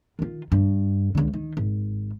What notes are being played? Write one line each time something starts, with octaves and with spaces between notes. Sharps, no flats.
D#3 F4
G2
C#2 D3
D#3
G#1